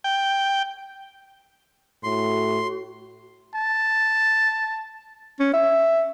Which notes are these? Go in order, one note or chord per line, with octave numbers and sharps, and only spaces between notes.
G5
A2 F#4 C6
A5
C#4
E5